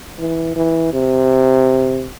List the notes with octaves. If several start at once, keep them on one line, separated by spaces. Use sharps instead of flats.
E3
E3
C3